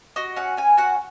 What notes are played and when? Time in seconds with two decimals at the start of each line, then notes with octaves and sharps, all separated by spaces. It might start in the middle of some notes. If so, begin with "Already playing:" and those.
0.16 F#4 D#5
0.36 C#4 F#5
0.57 C#4 G#5
0.77 F#4 F#5